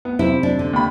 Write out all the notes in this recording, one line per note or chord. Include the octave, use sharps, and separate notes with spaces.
B3
C3 C4 E4
D4
D3
D#2 B5